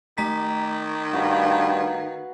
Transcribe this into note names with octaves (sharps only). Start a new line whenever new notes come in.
D#3 A3 A#5 B6
G2 F#4 B4 F5